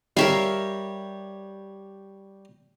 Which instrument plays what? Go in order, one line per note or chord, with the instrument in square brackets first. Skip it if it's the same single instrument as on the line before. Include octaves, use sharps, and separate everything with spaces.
[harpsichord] G3 C#5 [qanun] A#4 E5 F5